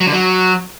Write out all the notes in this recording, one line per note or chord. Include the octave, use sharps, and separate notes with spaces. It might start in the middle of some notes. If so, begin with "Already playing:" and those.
F#3
D3
F#3